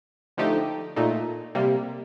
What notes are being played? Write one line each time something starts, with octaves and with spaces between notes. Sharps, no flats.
D3 F3 A3 D#4 G4
A#2 A3 D#4
C3 G3 A#3